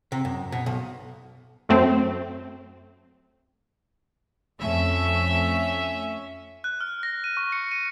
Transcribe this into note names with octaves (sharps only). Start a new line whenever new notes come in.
C3
F#2
B2
B1
F#2 A3 C4
F2 A3 C#4 E5
F#6
F6
A#6
D#7
C#6
C#7
D#7